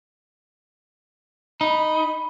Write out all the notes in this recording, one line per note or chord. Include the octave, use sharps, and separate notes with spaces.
D#4 B5